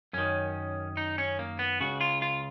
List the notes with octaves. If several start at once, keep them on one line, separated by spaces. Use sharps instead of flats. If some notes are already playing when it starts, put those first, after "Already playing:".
F#2 D#3 C#4
D#4
C#4
A#3
B3
C#2 C#3 F#4
F4
F4